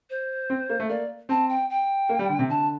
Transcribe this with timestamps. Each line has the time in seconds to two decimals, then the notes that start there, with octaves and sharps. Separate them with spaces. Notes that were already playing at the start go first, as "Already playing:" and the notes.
0.10 C5
0.50 C4
0.69 A#3
0.80 A3
0.89 A#3 D5
1.29 C4 A5
1.49 G5
1.70 G5
2.09 A#3
2.19 G3
2.29 D3
2.39 C3
2.49 D3 A5